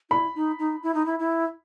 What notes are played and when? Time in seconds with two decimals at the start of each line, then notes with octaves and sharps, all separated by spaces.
0.10 E4 B5
0.35 D#4
0.59 D#4
0.83 E4
0.94 D#4
1.06 E4
1.19 E4